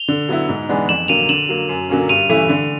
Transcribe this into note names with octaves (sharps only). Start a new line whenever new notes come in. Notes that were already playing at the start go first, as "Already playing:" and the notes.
Already playing: F7 G7
D3
F#3 B3 E4
G#2
E3 G#3 B3 D4
F2 E7 F#7
D3 F#3 A#3 D#7 F7
D3 E7 F#7
F#3 A#3
F#2
D3 F#3 A#3 C#4
G2 D#7 F7
E3 A3 C#4 E4
D3